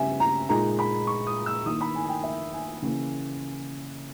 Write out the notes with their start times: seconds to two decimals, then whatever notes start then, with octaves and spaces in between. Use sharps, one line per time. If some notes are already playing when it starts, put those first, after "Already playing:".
Already playing: C#3 G3 B3 E5 G#5
0.20 A#5
0.49 A#2 G#3 D#4 A#5
0.79 B5
1.07 C#6
1.27 D#6
1.46 E6
1.66 D#3 A#3 E4 D#6
1.81 B5
1.95 G#5
2.05 G#5
2.09 G5
2.24 E5
2.53 G#5
2.82 C#3 E3 A#3